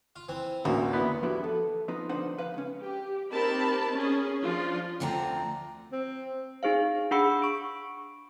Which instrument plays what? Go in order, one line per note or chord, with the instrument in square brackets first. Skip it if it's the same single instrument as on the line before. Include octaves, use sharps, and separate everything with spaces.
[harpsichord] F4
E3 C4 G#5
[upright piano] A1 [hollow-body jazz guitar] D2 [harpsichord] A#3
[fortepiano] B3 E4
[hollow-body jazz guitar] F3 B3 D4 E4 F#4 G4
A4
F3 B3 D#4
D2 F3 D4 D#4 C5 F#5
B4 F5
C#2 C#4
[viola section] G4
C4 D#4 G4 A#4 A5 B5
C#4 G#4
F3 D4 F4
[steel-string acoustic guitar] D2 D3 F3 C4 A#5
[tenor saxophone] C4
[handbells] D#4 G#4 C5 F5
D4 G#4 F#5 B5 E6 C#7
C#6 D7